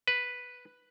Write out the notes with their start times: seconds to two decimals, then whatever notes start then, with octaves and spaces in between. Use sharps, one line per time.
0.08 B4